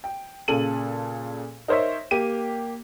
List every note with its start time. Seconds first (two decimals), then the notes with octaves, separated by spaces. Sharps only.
0.04 G5
0.48 A#2 C#3 A4 D#7 F#7
1.68 D#4 A#4 C5 C#5 E5
2.11 A#3 G4 D#7